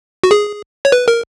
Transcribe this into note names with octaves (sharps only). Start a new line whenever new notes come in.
F#4
G#4
C#5
B4
A#4